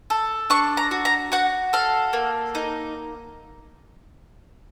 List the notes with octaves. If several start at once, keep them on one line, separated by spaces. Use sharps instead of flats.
A4
D4 C#6
A#5
F#4
A#5
F#4 F#5
A4 F5
A#3
D#4